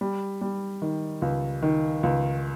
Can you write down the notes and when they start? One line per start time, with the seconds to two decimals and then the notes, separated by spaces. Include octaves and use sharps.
0.01 G3
0.41 G3
0.82 D#3
1.22 C#2
1.62 D#3
2.03 C#2